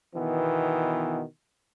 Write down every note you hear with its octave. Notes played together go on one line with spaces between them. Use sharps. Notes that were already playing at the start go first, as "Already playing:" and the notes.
B2 D#3 E3 B3